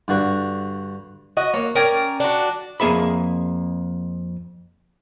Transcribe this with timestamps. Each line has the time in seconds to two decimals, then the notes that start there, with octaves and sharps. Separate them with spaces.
0.08 G2 D3 F#4
1.37 F#4 D#5
1.54 A#3 C#5 A#5
1.75 C#4 A#4 D5 G5 G#5 D#6
2.20 D4 F#4
2.80 F2 A#3 G#4 E5 B5